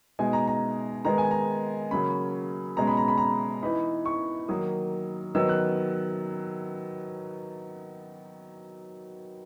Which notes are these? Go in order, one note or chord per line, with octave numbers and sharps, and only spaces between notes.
B2 G#3 D#4 G#5
A#5
A#5
D#3 G#3 B3 D#4 A#5
G#5
A#5
C#3 F#3 A#3 C#4 B5
B2 G#3 C#4 A#5
B5
A#5
B5
A#5
E3 B3 D#4 B5
C#6
D#3 F#3 A#3 D#6
D#3 F#3 B3 D#4 E6
F#6